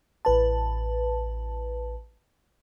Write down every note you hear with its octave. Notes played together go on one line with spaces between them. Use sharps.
A1 B4 A5